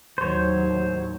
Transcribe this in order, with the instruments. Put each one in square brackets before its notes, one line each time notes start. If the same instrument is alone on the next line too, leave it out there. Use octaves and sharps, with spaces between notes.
[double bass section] D#2 A2 F#3 [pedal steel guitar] C5 C#5